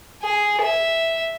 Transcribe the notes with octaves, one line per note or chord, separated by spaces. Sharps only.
G#4
E5